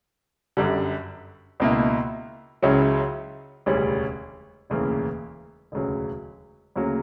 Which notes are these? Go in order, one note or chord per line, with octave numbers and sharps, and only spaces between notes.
G1 F#2 D3 G3
C#2 B2 A#3 E4
C#2 C#3 F#3 C#4 E4
E1 D2 C#3 G3 C#4
E1 D2 C#3 E3 A#3
E1 D2 C#3 F#3
D2 C#3 F#3 A#3